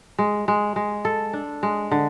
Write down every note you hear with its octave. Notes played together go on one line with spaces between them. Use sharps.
G#3
G#3
G#3
A4
D4
G#3
D3